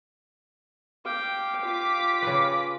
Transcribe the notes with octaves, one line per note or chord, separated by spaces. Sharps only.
G4 F5 G5
F4 D6 B6
C#3 B4